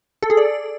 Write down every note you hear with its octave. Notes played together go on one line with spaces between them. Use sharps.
A4
G#4
D5